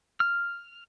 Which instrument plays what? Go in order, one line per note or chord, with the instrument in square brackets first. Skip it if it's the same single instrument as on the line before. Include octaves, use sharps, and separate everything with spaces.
[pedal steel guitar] F6